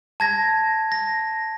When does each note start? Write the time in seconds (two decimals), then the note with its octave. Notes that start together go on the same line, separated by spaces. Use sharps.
0.20 A5 G#6 A#6
0.92 A#6